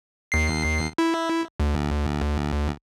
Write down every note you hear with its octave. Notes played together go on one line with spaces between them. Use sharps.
D#2 C7
E4
D2